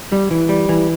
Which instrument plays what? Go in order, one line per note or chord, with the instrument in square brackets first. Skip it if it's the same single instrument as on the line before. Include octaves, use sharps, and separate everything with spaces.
[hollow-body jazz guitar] G3
E3
G3
E3